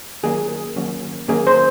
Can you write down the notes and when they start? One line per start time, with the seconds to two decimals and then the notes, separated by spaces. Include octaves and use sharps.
0.23 D#3 F#3 A#3 C#4 G#4
0.76 D#3 F#3 A#3 C#4
1.28 D#3 F#3 A#3 C#4 G#4
1.47 C5